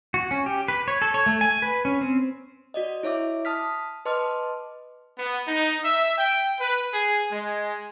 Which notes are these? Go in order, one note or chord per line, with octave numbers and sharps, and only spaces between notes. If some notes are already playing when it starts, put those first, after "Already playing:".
F#4
C#4
G4
B4
C#5
A4
C#5
A3
G#5
B4
C#4
C4
F#4 D5 D#5
E4 C#5 E5 D6
A5 D#6 F6 B6
B4 D#5 A5 C6 D6 F6
B3
D#4
E5
G5
B4
G#4
G#3